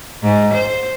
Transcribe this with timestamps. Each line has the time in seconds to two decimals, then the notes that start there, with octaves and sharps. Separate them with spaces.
0.23 G#2
0.54 C5